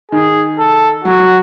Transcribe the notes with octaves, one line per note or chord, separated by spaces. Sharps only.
D#3 G#4
A4
F#3 F#4
F#3